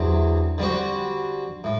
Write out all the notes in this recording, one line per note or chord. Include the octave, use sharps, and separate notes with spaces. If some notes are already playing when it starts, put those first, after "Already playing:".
Already playing: E2 D3 F#3 C4 G4
D3 G3 C4 F#4
A2